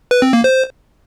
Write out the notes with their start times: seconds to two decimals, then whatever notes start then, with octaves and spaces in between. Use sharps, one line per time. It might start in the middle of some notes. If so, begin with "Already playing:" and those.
0.11 B4
0.22 C4
0.33 A#3
0.44 C5